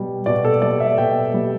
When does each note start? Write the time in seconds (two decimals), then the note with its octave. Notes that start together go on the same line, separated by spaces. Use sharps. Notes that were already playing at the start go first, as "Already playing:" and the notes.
Already playing: B2 G3
0.26 B2 D5
0.45 A4
0.62 G3 D5
0.80 E5
0.98 B2 G5
1.34 G3